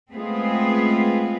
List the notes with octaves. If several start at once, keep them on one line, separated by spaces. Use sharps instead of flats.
G#3 A3 B3 C4 F4 G#4